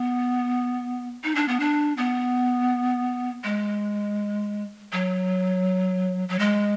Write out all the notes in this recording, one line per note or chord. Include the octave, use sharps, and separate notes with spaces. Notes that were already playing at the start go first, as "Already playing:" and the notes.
Already playing: B3
D#4
D4
B3
D4
B3
G#3
F#3
F#3
G#3